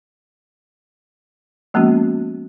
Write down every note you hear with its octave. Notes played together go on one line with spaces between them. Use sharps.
F3 G#3 A#3 B3 C#4 F#4